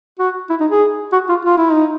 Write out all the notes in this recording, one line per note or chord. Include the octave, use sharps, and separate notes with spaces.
F#4
E4
D#4
G#4
F#4
F4
F4
E4
D#4